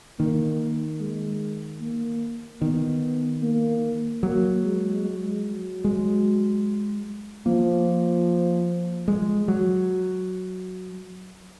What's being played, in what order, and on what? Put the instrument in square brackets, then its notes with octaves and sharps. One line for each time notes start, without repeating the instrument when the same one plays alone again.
[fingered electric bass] D#3 [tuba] A#3
[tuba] G#3
A#3
[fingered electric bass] D#3 [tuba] B3
[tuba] A#3
[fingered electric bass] F#3 [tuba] A#3
[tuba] G#3
G#3
F#3
[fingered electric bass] G#3
[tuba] F3 [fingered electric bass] A#3
[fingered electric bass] G#3
F#3